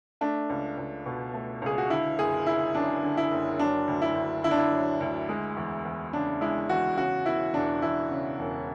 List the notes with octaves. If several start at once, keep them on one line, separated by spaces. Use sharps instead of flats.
A3 D4
C#2
C#2
B2
A3
C#2 G#4
F#4
D3 E4
F#1 G#4
F#1 E4
F#2 D4
D3
E4
F#1
F#3 D4
D2
E4
D2
D3 E4
D4
E4
F#3
D2
G#3
E2
E2
C#3 D4
G#3 E4
E2 F#4
C#3 F#4
E1 E4
E1 D4
E2 E4
C#3
E1